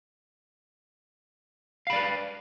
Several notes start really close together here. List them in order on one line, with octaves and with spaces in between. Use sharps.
F5 B5 D5 B4